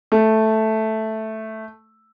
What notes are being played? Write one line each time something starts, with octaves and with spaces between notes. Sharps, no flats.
A3